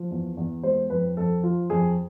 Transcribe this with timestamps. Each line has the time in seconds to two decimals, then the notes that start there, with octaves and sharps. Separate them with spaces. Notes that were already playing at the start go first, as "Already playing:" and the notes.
Already playing: F3
0.11 E2
0.37 E2
0.63 G#3 C5
0.90 F2 B4
1.17 F2 A4
1.43 F3 F4
1.70 F2 G#4